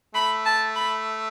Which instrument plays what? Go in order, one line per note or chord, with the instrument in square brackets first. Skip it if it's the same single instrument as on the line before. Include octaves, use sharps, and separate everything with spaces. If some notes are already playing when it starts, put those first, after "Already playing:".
[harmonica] A3 [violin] B5
[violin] A5
B5